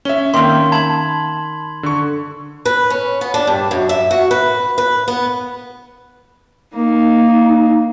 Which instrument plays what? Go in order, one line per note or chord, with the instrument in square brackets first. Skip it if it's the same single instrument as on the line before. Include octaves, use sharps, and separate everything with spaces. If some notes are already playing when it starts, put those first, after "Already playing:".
[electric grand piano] C#4 E5 [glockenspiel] G7
[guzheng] D#3 F5 [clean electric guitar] A#3 C4 [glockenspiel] C6
[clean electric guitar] A5 [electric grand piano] B5 [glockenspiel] G#6 F#7
[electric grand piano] D3 C#6
[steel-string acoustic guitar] B4
C#4
B3
D4
G2
F#2
E5
F#4
B4
B4
B3
[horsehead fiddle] A#3 D#4